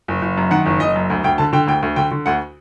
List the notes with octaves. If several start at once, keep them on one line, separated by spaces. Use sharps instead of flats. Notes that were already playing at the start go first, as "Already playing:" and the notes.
F#1
F#1
F#2
D#3 F#5
F#1
F#1 D#5
F#2
D2
D2 G5
D3 A5
D3 G5
D2 G5
D2
D3 G5
D3
D2 F#5